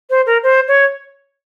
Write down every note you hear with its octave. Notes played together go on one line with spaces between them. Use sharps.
C5
A#4
C5
C#5